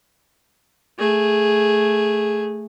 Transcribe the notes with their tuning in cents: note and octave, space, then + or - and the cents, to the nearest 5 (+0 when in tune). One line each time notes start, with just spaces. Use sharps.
A3 +0 G#4 +0